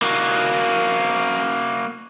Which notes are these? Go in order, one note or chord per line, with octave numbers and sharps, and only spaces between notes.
A#3 F#4